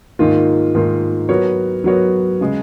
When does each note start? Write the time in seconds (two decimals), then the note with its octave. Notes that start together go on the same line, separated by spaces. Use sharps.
0.19 G#2 D#3 A#3 F4
0.75 G#2 D#3 A#3 F4
1.29 F#3 B3 F#4 A#4 C#5
1.84 F#3 B3 F#4 A#4 C#5
2.41 C#3 G#3